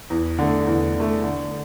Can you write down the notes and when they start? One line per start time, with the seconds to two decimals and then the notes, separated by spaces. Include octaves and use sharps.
0.10 E2
0.39 D3 A3
0.67 E2
0.95 D3 A3
1.24 D3